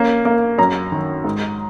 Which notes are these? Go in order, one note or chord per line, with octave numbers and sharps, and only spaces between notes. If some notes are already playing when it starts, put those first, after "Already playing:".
Already playing: A#3 C#4
A#3
F#2 A#5
D#3
G#2